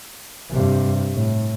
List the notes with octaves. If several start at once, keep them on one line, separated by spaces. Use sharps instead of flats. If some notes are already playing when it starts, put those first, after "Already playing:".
G2 C3
A2